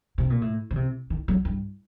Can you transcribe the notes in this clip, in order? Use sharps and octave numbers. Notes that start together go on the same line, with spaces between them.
C3
A#2
A2
D3
C3
D#3
F#3
G2